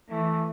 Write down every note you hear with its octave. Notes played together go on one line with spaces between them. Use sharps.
E3 A3